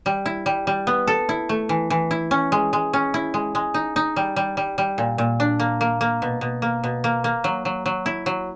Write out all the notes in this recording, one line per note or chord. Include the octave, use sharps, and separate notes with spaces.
G3
E4
G3
G3
B3
A4
E4
A3
E3
E3
E4
C#4
G#3
G#3
C#4
E4
G#3
G#3
D#4
D#4
G3
G3
G3
G3
A#2
A#2
D4
A#3
A#3
A#3
B2
B2
A#3
B2
A#3
A#3
F#3
F#3
F#3
E4
F#3